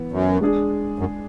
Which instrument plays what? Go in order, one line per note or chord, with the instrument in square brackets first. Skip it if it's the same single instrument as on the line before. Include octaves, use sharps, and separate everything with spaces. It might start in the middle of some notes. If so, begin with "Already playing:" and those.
Already playing: [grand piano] E3 B3
[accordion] F#2
[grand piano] G#3 D4 G#4
[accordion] F#2